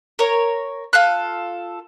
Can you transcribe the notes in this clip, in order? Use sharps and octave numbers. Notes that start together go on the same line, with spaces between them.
A#4 C#5
F4 A4 F#6